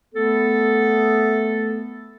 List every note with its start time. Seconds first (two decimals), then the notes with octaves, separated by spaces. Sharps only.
0.15 A3 B3 A4